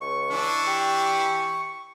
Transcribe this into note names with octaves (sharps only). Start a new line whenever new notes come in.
C#2 C#6
E3 D4
G4